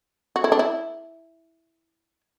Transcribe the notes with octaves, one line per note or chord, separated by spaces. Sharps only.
F#4
E4
D4
E4